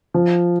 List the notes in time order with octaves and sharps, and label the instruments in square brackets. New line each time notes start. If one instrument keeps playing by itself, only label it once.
[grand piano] F3